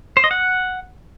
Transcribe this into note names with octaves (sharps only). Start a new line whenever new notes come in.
C5
D#5
F#5